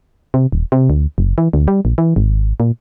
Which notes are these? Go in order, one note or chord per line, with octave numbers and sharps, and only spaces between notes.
C3
D#1
C3
D2
F#1
E3
D2
G3
A#1
E3
G#1
A#2